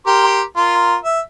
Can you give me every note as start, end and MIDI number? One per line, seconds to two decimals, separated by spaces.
0.07 0.41 67
0.07 0.41 70
0.07 0.41 84
0.57 0.95 65
0.57 0.95 70
1.04 1.20 76